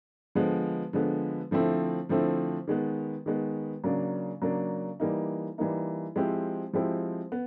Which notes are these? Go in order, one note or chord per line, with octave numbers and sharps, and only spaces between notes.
D3 F3 G#3 B3
D3 F3 G#3 B3
D3 F3 A3 C4 E4
D3 F3 A3 C4 E4
D#3 G#3 B3
D#3 G#3 B3
C#3 F#3 A#3 D4
C#3 F#3 A#3 D4
E3 G3 A#3 D#4
E3 G3 A#3 D#4
F3 G#3 C4 E4 G4
F3 G#3 C4 E4 G4
B3